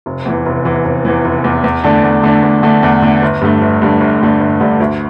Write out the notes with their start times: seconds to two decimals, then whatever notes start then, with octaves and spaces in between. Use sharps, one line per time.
0.06 F1
0.25 E2 E3
0.46 F1
0.65 E2 E3
0.85 F1
1.05 E2 E3
1.25 F1
1.44 E2 E3
1.64 E2
1.84 D3 A3 D4
2.03 E2
2.23 D3 A3 D4
2.42 E2
2.63 D3 A3 D4
2.83 E2
3.02 D3 A3 D4
3.22 G1
3.41 G2 D3 A3
3.61 G1
3.82 G2 D3 A3
4.01 G1
4.21 G2 D3 A3
4.40 G1
4.60 G2 D3 A3
4.80 D2